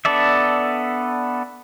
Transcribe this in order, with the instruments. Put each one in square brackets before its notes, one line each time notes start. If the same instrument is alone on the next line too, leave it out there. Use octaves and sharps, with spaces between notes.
[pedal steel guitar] B3 D4 A4 D5 E5